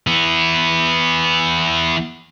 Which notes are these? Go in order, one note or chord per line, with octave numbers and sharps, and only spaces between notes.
E3 B3